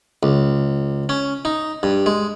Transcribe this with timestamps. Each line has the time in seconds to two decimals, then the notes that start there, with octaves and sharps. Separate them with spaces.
0.23 C#2
1.09 C#4
1.45 D#4
1.83 G2
2.06 G#3